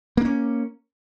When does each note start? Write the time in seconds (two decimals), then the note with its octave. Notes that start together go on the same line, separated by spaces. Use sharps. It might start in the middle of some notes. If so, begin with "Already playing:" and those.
0.17 A#3
0.21 D4
0.25 C#4